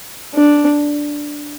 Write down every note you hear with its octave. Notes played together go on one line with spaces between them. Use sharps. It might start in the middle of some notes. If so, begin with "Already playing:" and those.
D4